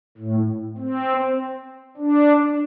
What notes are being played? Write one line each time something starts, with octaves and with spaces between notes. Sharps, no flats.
A2
C4
D4